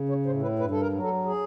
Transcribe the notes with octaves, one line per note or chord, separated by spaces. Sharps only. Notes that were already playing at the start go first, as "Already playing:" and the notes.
Already playing: C#3
C#5
A2 C5
B4
G2 B4
A4
A#4
F#3
A4
G#4